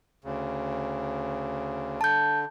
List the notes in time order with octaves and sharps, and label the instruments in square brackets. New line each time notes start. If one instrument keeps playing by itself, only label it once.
[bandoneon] D2 C#3
[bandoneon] D3 [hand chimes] A5 G6